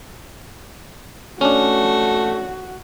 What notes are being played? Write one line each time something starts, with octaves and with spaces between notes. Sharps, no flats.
A3 C#4 D4 F#4